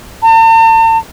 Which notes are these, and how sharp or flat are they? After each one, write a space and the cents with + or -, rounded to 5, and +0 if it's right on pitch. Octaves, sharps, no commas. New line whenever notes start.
A5 +45